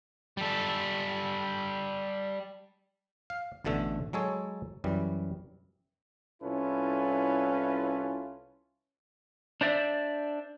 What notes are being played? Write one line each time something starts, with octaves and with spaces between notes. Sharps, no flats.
G3 A4
F5
A1 B2 D3 A3 E5
F#3 G#3 A4 C#5
F#2 E3 G3
C2 C#4 E4 F4 A4 B4
D4 C5 D5 E5